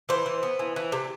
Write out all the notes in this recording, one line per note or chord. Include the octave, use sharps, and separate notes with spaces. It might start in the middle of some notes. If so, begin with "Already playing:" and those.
E3 C5
E3
B3
E3
E3
C3